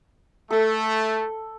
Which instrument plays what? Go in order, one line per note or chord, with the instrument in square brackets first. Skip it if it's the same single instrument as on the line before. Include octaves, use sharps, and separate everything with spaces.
[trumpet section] A3 [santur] A4